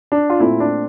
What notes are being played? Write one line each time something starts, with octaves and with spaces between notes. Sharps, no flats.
D4
F4
A#2 A3 C4 E4
D4